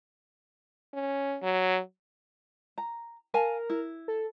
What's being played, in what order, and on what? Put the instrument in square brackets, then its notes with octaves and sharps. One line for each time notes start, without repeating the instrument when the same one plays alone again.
[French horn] C#4
F#3
[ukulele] A#5
[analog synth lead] A#4 [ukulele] F5 G#5 A5
[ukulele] E4
[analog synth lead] A4